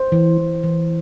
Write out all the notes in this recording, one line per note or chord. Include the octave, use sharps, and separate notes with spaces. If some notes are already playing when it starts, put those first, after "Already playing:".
Already playing: C5
E3
E3
E3